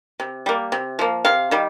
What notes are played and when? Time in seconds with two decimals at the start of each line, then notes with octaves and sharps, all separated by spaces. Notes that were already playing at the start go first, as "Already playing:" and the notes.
0.20 C3
0.46 G3 A#3
0.72 C3
0.99 F3 A#3
1.25 C3 F5
1.51 D#3 G3